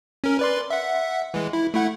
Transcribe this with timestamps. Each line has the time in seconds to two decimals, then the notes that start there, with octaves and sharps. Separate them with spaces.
0.24 C#4 A#4
0.39 B4 D5 C6
0.70 E5 F#5
1.34 E3 G#3
1.53 E4
1.74 A3 E4 F#5